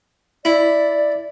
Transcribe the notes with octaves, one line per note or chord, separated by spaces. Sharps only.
E4 D5